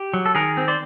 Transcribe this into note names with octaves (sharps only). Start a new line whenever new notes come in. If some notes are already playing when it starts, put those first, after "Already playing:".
Already playing: G4
F#3
A4
D#3 G#4 A#4
C4
C5 D5